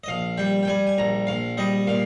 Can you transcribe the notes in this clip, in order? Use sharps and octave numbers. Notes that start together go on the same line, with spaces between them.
D#5
A#1 F5
G3 G5
G5
G3 G#5
G#5
A#1 A#5
A#1 F5
G3 D#5
A#2 F5